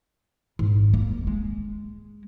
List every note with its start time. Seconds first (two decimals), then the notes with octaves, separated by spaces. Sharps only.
0.59 G#1
0.94 A#3
1.27 G#3